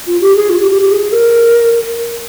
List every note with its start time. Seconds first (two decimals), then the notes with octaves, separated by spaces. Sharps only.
0.07 F4
0.21 G4
0.36 G#4
0.49 F4
0.60 G4
0.71 G4
0.81 G4
0.92 G#4
1.12 A#4